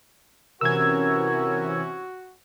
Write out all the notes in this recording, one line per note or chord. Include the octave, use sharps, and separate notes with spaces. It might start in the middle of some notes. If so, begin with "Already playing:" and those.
C3 E3 C#4 F#4 A#4 E6 G#6